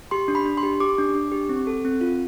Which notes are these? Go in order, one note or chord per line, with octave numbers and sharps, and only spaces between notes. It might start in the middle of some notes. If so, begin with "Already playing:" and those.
G4 C6
D4
B5
D4
C6
G4
G4 D6
D4
D4
G4
C4
A4
C4
F4